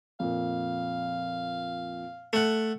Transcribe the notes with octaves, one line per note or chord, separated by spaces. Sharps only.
F2 A#2 F5
A3 F#5 C#7